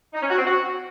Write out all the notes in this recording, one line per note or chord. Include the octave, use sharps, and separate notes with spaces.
D#4
C#4
F#4
C4
F#4